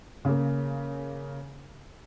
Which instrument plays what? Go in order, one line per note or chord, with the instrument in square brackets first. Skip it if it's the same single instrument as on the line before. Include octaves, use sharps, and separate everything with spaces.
[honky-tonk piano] C#3 A#3